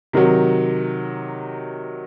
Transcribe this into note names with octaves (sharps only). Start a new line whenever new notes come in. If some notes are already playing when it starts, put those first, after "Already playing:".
C3 D#3 F#3